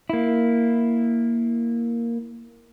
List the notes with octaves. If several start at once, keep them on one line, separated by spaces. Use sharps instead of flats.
A#3 E4